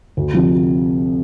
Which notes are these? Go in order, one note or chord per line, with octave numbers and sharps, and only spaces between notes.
D2
C3 F3